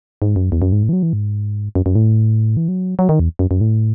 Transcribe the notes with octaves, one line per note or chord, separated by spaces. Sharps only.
G#2
F#2
E2
F#2
G#2
A2
E3
F#3
E3
G#2
F#2
F#2
A2
E3
F#3
F#3
D#3
E2
F#2
F#2
A2